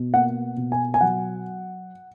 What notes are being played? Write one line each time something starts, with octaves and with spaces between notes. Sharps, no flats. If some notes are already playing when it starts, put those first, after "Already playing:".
Already playing: B2
A#3 F#5
B2
G#5
G#5
F#3 F#5